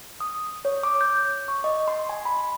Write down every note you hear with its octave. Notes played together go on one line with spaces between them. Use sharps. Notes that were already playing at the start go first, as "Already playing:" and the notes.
D#6
C#5
D6
G6
C#6
D#5
C6
G#5
B5